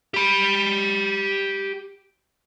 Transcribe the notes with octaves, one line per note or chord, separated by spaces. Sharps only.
G4 B5